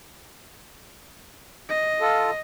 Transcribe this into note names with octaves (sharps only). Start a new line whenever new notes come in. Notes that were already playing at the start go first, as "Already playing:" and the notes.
D#5
F4 A4